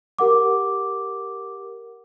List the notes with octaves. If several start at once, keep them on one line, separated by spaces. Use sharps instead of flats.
G4 A#4 F#5 D6